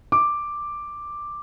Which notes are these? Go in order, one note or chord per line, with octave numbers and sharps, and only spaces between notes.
D6